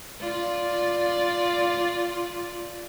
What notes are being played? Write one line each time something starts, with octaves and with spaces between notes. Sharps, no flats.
F4 D5